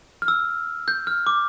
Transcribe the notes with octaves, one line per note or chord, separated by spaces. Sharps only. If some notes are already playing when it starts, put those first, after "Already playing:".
F6
E6
G6
F6
D6